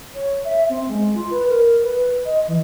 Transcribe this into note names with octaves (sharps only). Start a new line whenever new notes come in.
C#5
E5
C4
G#3
F4
B4
A#4
B4
D#5
E3